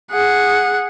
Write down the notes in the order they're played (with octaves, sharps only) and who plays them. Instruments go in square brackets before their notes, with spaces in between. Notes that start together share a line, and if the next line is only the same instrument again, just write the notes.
[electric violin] G#4 F#5